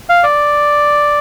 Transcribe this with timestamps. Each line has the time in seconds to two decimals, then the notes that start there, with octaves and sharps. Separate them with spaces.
0.09 F5
0.23 D5